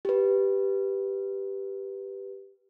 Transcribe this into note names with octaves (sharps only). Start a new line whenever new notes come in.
G4 B4